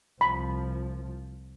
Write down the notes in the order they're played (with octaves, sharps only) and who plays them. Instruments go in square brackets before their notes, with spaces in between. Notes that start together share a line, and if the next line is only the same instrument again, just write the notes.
[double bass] C2 F3 [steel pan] B5